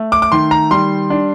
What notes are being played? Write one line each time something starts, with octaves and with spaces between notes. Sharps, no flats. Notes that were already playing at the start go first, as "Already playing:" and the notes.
Already playing: A3
D6
D6
D#3 C6
A#5
G3 C6
D4